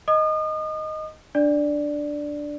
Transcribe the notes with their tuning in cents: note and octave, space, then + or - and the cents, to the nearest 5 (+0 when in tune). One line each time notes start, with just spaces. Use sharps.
D#5 +0 D#6 -40
D4 +0 D5 +0